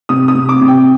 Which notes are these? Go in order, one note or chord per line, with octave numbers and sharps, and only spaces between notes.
C3 D#6
D#6
C3
D6
C3
G5